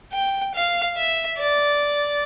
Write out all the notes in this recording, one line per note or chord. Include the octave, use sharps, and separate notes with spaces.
G5
F5
E5
D5